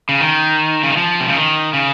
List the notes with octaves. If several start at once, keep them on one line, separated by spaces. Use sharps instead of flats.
C#3
D#3
C#3
D#3
F3
C3
C#3
D#3
C#3